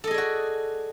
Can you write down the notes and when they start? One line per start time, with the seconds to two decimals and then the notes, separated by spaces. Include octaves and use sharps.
0.04 A4
0.07 D#5
0.11 G#4
0.14 D5
0.18 F#4